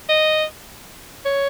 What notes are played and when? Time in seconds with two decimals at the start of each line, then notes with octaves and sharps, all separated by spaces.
0.09 D#5
1.25 C#5